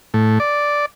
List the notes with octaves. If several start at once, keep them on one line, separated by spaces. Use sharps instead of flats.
A2
D5